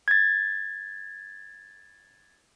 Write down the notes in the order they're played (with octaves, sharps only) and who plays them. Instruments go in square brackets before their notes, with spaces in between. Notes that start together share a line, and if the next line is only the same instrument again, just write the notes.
[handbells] G#6 A6